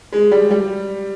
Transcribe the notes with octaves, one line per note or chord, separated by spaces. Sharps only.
G#3
G3
G3